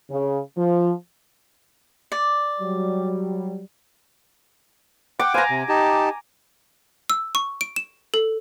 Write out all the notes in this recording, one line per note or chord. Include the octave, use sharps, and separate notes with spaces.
C#3
F3
D5
F#3 G3
F#5 G5 D6
B4 C5 F5 G#5 A#5
C3
D#4 G4 A5
E6
C#6
D7
E7
A4